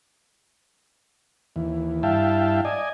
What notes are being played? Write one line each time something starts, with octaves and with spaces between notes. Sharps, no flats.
D#2 E3
G2 E4 E5 F5 G5 A5
D5 D#5 G#5